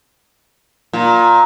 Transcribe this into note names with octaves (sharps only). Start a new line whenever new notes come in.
A#2